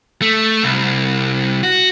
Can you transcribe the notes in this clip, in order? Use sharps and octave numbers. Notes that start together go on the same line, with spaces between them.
A3
C2
F#4